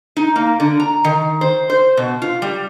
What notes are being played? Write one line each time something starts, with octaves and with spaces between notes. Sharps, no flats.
D#4
A#3
D3
A#5
D#3
C5
C5
B2
F4
G3